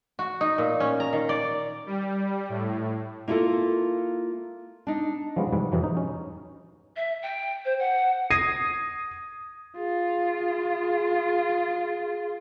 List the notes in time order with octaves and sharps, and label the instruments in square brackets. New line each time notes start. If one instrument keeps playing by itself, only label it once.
[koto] F#4
D#4
A#2
C#4
A#5
D#3
D5
[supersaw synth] G3
A2
[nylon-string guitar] A#3 E4 F4 G4 A4 A#4
D4 D#4
[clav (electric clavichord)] F3 G3 G#3 B3 C#4
G#2 C3 E3 G3
F2 C3 E3 F#3
D#4
C#4
[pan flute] E5
G5
C5
F#5
[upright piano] D#6 G#6 A#6 C7 D#7
[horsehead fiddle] F4 [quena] G#4